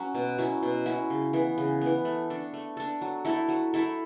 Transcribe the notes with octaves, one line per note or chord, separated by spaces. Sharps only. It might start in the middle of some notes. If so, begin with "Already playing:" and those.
Already playing: F#3 C#4
B2
F#3 C#4 E4
B2
F#3 C#4 E4
C#3
E3 B3
C#3
E3 B3
A3
D4 A4
A3
D4 A4
F#3
A3 E4 A4
F#3
A3 E4 A4